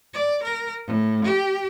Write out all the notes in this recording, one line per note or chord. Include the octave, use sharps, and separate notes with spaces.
D5
A#4
A2
G4